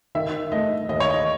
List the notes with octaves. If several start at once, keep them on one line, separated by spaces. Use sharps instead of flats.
D#3 E5
A3 D#5
D#2 D#5
C#5
D#5